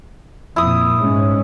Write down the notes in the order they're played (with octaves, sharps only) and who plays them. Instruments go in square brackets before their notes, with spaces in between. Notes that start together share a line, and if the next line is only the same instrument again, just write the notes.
[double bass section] F2 A#2 [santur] E4 D#6
[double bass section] G#2 G#3 C#4